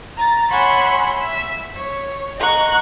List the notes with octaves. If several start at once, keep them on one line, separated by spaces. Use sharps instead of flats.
A#5 A6
C#5 E5 F#5 G#5 B5 C6
E5
C#5
D#5 F#5 A#5 C#6